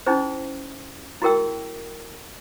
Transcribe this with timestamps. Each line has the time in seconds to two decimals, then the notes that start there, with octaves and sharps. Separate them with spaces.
0.06 C#4 D#4 E4 G#4 C5
1.22 E4 F#4 G#4 A#4 G5 E6